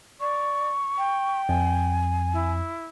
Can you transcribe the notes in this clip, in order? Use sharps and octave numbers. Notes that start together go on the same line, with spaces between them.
D5 C#6
G5
F2 G#5
E4